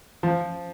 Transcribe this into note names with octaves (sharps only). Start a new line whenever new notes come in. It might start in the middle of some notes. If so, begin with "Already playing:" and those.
F3